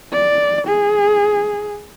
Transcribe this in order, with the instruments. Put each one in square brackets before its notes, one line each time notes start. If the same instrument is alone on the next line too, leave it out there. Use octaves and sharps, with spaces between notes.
[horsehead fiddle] D5
G#4